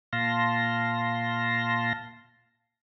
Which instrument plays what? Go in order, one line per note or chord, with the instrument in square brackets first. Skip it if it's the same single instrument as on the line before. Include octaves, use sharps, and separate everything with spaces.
[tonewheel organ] A#2 F5 A5 C6 A#6